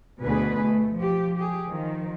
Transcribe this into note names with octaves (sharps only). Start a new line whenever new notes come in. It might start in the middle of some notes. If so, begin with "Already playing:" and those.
D2 B2 D3 G#4 B4
A3
F3 G4
G4 G#4
D#3 F3